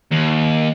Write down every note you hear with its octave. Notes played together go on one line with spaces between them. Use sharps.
D#2